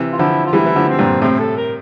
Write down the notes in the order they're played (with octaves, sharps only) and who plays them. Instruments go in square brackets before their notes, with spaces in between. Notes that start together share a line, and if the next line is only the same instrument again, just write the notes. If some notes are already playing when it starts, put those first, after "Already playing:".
Already playing: [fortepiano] C3 E3
[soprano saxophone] F4
[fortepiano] D3 F3 [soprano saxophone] E4
[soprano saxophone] F4
[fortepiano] E3 G3 [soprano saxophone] E4
[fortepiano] E3
D3 F3
[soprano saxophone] C4
[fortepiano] G2 A#2
[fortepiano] A2 C3 [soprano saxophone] C4
[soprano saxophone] A4
A#4